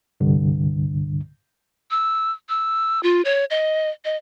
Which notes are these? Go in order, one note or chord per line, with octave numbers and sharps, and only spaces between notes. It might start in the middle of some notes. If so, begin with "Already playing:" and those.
C2 G2 D3
E6
E6
F4
C#5
D#5
D#5